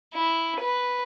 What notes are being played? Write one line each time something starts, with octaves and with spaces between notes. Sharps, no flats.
E4
B4